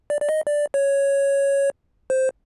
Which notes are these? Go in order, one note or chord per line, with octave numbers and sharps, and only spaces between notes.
D5
D5
D#5
D5
C#5
C5